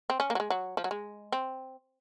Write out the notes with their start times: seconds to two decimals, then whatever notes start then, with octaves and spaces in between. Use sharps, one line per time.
0.10 C4
0.20 C#4
0.30 A#3
0.35 F#3
0.40 G#3
0.50 F#3
0.77 F3
0.84 F#3
0.91 G#3
1.32 C4